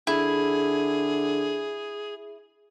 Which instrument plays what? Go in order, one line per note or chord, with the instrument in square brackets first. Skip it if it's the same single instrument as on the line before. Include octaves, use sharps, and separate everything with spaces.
[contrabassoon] D3 [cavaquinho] E4 [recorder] G#4